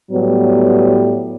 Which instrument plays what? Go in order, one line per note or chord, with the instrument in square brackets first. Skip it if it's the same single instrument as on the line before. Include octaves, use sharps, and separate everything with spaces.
[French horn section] A2 F#3 G3 B3